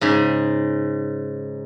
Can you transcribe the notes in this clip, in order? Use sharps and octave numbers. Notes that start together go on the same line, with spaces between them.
G#2 C#3